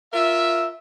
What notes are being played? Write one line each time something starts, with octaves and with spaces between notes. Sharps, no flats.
F4 A#4 E5